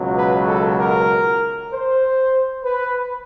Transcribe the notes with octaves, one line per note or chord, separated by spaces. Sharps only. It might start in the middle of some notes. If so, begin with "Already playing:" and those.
Already playing: C#2 B2 F#3
B4
A4
A#4
C5
B4